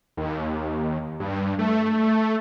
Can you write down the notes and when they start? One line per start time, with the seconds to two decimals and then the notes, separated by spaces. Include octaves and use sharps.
0.17 D#2
1.20 G2
1.59 A3